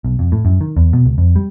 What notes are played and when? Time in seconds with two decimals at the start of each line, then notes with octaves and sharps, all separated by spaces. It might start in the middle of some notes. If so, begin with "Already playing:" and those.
0.04 B1
0.19 F2
0.32 A2
0.45 F#2
0.61 D#3
0.77 E2
0.93 B2
1.06 C#2
1.18 F2
1.36 G3